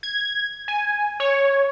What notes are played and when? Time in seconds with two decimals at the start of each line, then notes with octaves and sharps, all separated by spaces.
0.03 G#6
0.68 G#5
1.20 C#5